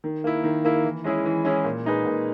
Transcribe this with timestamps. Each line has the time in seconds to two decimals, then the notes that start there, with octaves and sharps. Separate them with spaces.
0.04 D#3
0.24 A#3 E4
0.44 D#3
0.65 A#3 E4
0.84 E3
1.04 G#3 C#4 E4 G#4
1.25 E3
1.44 G#3 C#4 E4 G#4
1.64 A#2
1.86 G#3 D#4 G#4 B4
2.05 A#2